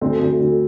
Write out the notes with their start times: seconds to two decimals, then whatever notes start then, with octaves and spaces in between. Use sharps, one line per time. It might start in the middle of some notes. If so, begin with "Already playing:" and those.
0.01 D2 C4
0.21 D2
0.40 D2